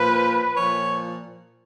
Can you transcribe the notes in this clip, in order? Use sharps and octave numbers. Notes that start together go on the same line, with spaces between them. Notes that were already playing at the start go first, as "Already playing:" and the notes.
Already playing: A#2 F3 B4
A#2 F3 C#5